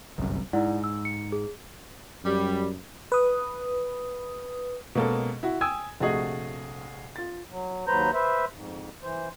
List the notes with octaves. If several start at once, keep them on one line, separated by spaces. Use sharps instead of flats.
G1 C2 F#2
G#2 E4 D5 F#5
E6
C#7
G#4
F#2 G3
B4 D#6
B2 G#3 A#3 C#4 A4
E4 F#4
G5 G#5 D#6 E6 G#6
A#1 C3 A3 F#4 G#4 D#5
F4 A6
F#3
D#2 F#3 B4 C5 A#5 G6
B4 C5 E5
F2 G#2
E3 C5